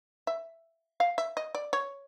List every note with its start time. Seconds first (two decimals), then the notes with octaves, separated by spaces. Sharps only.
0.27 E5
1.00 F5
1.18 E5
1.37 D#5
1.55 D5
1.73 C#5